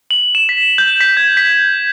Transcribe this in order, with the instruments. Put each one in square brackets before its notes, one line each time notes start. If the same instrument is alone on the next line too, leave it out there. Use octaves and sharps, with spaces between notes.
[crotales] F#7
E7
B6
G6
B6
G#6
B6